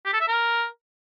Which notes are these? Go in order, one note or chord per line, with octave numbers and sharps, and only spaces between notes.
G4
A4
E5
A#4